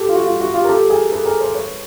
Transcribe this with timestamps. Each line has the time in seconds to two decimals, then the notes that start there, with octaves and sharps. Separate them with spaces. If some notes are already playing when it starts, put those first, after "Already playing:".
Already playing: G4 A4
0.09 F4
0.15 F#4
0.26 F4
0.40 F#4
0.54 F4 G4
0.65 A#4
0.69 G4 A4
0.90 G#4 A#4
1.12 A4 B4
1.25 G#4 A#4
1.40 A#4 C5
1.54 B4 C#5